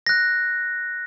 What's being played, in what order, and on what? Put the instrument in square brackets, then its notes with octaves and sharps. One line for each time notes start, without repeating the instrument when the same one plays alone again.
[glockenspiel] F#6 A#6